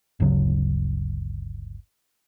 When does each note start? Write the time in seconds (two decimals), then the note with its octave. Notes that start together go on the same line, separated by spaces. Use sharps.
0.20 G1 D2 C#3 F#3